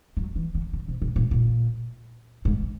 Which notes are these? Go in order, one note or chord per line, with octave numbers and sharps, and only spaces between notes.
F#3
E3
D3
C#3
C3
B2
A#2
A#2
G#2